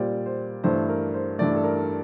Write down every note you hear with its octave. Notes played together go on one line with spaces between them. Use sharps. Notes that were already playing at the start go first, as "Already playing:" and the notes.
Already playing: A#2 G3 C5 D5
C5
G2 E3 A3 C5
A#4
C5
G2 E3 A3 D5
A4
A#4